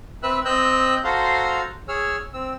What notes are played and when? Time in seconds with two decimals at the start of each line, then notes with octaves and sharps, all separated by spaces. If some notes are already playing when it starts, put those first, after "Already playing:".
0.23 C4 B4 E5 E6 F#6
0.45 C4 D#5 E6 F#6 G6
1.04 F#4 A4 C5 F5 A#5 C6
1.88 G#4 C#5 E6 F6
2.33 C4 E6